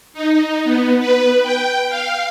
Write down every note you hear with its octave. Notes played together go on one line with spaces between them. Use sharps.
D#4
B3
B4
G5
F5